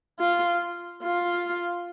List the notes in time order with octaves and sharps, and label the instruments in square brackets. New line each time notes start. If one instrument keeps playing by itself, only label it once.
[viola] F4
F4